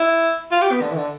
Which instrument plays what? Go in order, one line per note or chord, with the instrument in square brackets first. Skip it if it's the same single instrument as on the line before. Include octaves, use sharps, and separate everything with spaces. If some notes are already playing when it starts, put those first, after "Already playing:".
Already playing: [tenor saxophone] E4
F4
G4
B3
D3
E3
D3